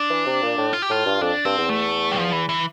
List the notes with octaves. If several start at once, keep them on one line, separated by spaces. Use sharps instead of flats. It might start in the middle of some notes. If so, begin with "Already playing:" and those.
Already playing: D4
E3
C3
A#2
A2
F4
G4
A2 F4
G2
F2 D4
G2 C4
E2
A3
G3
F3
E3
E3